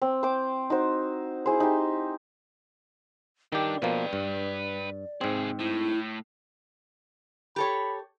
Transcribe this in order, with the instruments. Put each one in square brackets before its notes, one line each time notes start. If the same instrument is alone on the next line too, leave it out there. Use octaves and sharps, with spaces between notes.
[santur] C4
C5 G5 D6
D#4 F#4 C5
E4 G#4 C5
D#4 G4
[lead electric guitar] G2 D4 [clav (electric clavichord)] D#3 G4 [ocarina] D5
[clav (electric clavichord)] B2 F3 A#3 [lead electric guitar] B4 G5
[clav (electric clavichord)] G2
[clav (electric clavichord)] G#2 C4 [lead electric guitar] C3 G#4
[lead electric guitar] A2 [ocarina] E4
[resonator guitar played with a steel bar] G4 A4 C#5 [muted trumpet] B5